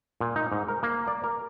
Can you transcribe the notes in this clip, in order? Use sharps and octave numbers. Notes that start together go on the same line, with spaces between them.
A#2
D#4
G#2
A#4
A#3
D5
A#4